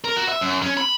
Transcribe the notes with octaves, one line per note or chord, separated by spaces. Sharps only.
A#4
F#4
E5
F#2
C#4
B5